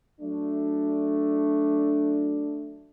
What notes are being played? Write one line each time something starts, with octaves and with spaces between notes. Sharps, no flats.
F#3 A3 D4